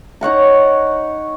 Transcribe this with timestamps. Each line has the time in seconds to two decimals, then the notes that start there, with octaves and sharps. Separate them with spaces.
0.21 D#4 C#5 F#5 A#5